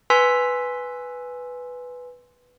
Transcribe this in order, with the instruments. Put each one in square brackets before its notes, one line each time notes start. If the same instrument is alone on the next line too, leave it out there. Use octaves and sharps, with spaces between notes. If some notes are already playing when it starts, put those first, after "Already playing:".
[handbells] B4 G#5 C6 E6 B6